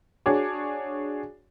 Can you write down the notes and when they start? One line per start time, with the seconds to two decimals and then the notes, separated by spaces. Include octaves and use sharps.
0.26 D4 F#4 G#4 C#5 D6